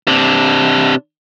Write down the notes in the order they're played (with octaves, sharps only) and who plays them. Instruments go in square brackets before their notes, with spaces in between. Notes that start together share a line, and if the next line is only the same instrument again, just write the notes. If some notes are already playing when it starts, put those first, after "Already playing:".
[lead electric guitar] C3 D4